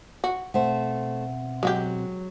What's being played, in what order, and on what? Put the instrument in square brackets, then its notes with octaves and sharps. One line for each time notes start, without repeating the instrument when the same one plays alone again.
[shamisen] F#4
[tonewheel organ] B2 C4 [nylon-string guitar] A3 C5 [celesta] E5 F#5
[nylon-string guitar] F#3 [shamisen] G#3 F#4 G4